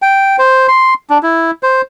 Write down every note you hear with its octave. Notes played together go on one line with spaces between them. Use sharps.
G5
C5
C6
D4
E4
C5